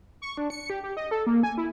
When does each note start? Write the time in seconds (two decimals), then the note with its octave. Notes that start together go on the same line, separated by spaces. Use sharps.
0.22 C#6
0.37 D4
0.50 C#7
0.70 G4
0.83 G4
0.97 D#5
1.11 A4
1.27 A#3
1.43 G#5
1.58 E4